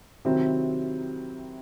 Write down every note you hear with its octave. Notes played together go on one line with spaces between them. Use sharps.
C3 D#3 F#3 C4 E4